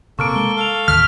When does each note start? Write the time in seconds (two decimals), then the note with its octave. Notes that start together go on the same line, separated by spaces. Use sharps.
0.19 C3 A#3 A4 C#6 F6 D7
0.36 G#3 G7
0.57 A4 F5 D7 F7
0.88 A1 D#2 D#3 E6 F6 B6